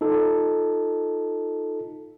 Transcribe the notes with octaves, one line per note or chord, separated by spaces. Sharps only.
D#4 F4 A4